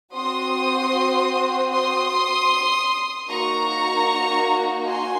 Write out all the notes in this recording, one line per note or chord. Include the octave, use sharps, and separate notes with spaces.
C4 F#4 C6 D#6
C6 D#6
A#3 D#4 F#4 A#5 C#6
G#5 C6